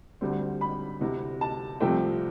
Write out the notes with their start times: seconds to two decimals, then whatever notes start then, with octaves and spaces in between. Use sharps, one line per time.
0.21 D2 D3 G3 C4
0.61 B5
1.00 D2 C3 E3
1.41 A5
1.80 C2 C3 F3 A3 C4 G5